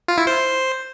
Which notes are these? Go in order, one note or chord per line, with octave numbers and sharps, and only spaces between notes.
F4
E4
C5